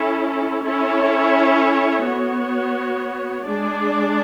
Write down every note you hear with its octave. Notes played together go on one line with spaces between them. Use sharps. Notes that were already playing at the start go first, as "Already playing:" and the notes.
Already playing: C#4 E4 A4
C#4 E4 A4 C#5
B3 F#4 C#5
G#3 D4 G#4 D5